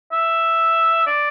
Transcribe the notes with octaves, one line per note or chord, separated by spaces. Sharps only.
E5
D5